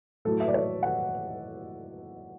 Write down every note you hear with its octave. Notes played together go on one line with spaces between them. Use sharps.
A2 F#3 A4
E5
D5
C#5
F#5